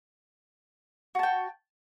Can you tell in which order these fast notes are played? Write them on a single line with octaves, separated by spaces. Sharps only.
F#4 A5 G5